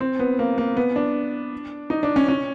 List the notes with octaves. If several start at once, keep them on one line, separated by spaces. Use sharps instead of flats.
C4
B3
A#3
A#3
B3
D4
D#4
D4
C#4
C#4